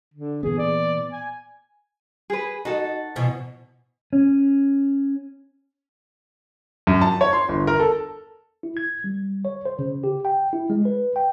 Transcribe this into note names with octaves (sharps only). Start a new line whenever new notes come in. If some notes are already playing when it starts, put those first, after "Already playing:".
D3
A#2 E3 B3 G#4
D5
G#5
G#4 B4
D#4 F#4 A4
B2 E3 F3
C#4
F#2
A5
C#5
C6
G1
A#4
A4
E4
G#6
G3
C#5
C5
C#3
G4
G5
E4
G#3
B4
G5